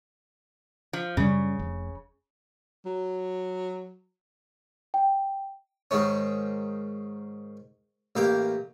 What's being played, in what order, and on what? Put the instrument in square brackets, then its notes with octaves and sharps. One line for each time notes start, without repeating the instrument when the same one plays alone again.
[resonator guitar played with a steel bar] F3
[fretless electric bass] F#2 G3 [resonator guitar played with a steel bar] C#3
[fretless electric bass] F1
[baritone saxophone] F#3
[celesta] G5
[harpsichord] G#2 D#3 C#4
A1 A#3 G4